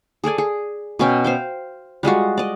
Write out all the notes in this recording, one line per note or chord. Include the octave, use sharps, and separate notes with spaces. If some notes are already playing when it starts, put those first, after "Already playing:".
G#4 A4 D5 G#5
G#4
B2 C#4 G5
C5 F5 G5
G3 G#3 F4 F#4
D5 D#5